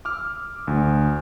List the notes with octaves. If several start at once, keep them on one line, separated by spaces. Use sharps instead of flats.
D6 E6 F6
D2